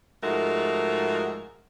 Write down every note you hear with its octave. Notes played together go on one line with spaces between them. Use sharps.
G#2 F3 G#3 A3 F#4 A#4